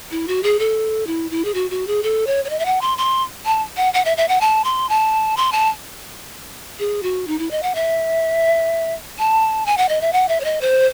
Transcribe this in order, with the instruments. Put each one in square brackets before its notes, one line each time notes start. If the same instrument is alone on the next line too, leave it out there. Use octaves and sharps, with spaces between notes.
[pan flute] E4
F#4
G#4
A4
E4
E4
G#4
F#4
F#4
G#4
A4
C#5
C#5
D#5
E5
F#5
C6
C6
A5
F#5
F#5
E5
E5
F#5
A5
C6
A5
C6
A5
G#4
F#4
D#4
E4
D#5
F#5
E5
A5
G#5
F#5
D#5
E5
F#5
E5
C#5
D#5
C5